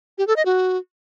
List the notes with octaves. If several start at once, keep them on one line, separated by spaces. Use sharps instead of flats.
G4
A4
D#5
F#4